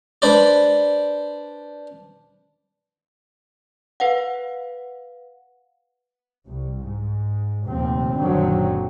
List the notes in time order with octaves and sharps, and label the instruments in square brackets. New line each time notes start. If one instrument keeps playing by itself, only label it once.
[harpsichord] D4 B4 C5 D5
[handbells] B4 F5 F#5
[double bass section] C2
G#2
F1 D#2 A#2 C4
F#1 A#2 D3 D#3 F#3 C4